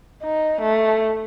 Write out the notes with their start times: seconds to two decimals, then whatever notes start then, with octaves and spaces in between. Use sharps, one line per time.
0.23 D#4
0.62 A3